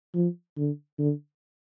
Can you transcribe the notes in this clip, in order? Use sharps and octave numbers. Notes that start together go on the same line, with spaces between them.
F3
D3
D3